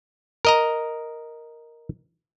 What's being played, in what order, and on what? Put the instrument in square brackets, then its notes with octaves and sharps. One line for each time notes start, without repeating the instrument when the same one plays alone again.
[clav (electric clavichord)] A#4 D#5 A#5